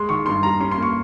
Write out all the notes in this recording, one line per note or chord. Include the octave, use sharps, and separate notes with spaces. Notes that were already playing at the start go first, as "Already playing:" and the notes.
Already playing: G#3 C6
D#3 C#6
G2 C6
G3 A#5
C#4 C6
C6
A#3 C#6